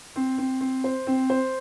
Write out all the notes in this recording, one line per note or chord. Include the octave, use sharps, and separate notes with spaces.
C4
C4
C4
C5
C4
C5